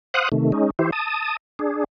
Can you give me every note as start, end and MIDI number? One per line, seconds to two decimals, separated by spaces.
0.14 0.29 72
0.14 0.29 77
0.14 0.29 78
0.14 0.29 87
0.14 0.29 90
0.32 0.52 48
0.32 0.52 51
0.32 0.52 57
0.52 0.70 56
0.52 0.70 61
0.52 0.70 63
0.79 0.91 52
0.79 0.91 64
0.79 0.91 67
0.79 0.91 72
0.92 1.37 81
0.92 1.37 87
1.59 1.84 62
1.59 1.84 68